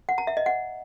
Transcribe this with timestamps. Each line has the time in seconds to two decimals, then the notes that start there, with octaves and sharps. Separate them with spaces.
0.09 F#5
0.18 A#5
0.27 E5
0.37 D#5
0.46 F#5